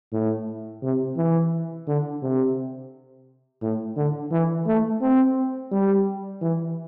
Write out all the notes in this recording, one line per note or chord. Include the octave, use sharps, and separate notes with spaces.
A2
C3
E3
D3
C3
A2
D3
E3
A3
C4
G3
E3